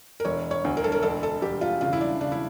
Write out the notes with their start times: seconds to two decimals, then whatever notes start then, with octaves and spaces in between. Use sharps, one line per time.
0.20 A#4
0.25 E1 C#5
0.51 C#5
0.65 D2
0.77 A#4
0.84 A4
0.92 A#4
1.03 E1 A4
1.23 A4
1.42 E1 G4
1.61 F4
1.81 C#3 F4
1.93 E4
2.01 D4
2.21 C#3 D4
2.32 E4